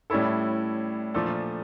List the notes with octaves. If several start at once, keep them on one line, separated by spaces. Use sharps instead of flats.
A2 G3 C#4 E4 A4
A#2 F3 A3 D4 A4